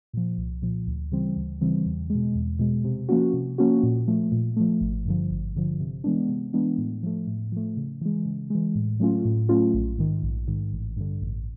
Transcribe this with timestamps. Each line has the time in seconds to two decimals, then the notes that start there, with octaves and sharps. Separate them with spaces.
0.13 A#2 F3
0.37 C2
0.62 A#2 F3
0.87 D2
1.12 C#3 E3 G3 C4
1.37 D2
1.61 C#3 E3 G3 C4
1.86 E2
2.10 G#3
2.15 B2
2.35 E2
2.59 B2 G#3
2.84 C3
3.09 F3 A#3 C#4 F#4
3.33 C3
3.58 F3 A#3 C#4 F#4
3.83 A#2
4.07 F3 A3
4.32 A#2
4.57 F3 A3
4.81 G#1
5.05 G2 D3 F3
5.31 G#1
5.55 G2 D3 F3
5.80 C3
6.04 E3 G#3 B3 D4
6.29 C3
6.53 E3 G#3 B3 D4
6.78 A2
7.03 F3 A3
7.27 A2
7.52 F3 A3
7.77 C#3
8.01 E3 G#3
8.25 C#3
8.50 E3 G#3
8.75 A2
9.00 F#3 A3 C#4 F4
9.25 A2
9.49 F#3 A3 C#4 F4
9.74 A#1
9.98 G#2 D#3
10.23 A#1
10.48 G#2 D#3
10.72 A1
10.97 G2 D3
11.21 A1